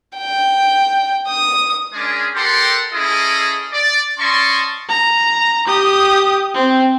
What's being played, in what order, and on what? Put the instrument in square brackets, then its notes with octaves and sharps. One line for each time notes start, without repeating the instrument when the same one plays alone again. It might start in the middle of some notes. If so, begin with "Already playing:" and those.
[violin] G5
D#6
[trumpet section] G#3 C#4 D4 G#4 A#4 D5
G4 A4 A#4 F#5 C6
C#4 E4 G#4 A4 D#5
D5
C#4 D5 D#5 A5 C6 C#6
[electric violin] A#5
G4 D#6
C4